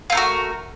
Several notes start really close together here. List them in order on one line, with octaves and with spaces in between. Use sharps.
F4 A3 A#4 F#4